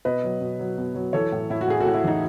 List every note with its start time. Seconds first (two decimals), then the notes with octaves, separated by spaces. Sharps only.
0.05 B2 B4 D#5
0.24 F#3
0.41 B2
0.59 F#3
0.78 B2
0.95 F#3
1.13 E3 A4 C#5
1.32 A2
1.50 A2 E4
1.61 F#4
1.68 A2 G#4
1.81 F#4 A4
1.86 A2
1.94 E4
2.04 E3 D#4